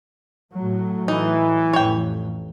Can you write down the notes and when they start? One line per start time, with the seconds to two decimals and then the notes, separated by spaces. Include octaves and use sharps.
0.53 A2 F#3 A3
1.08 E3 D#4
1.73 A1 F2 C#5 G5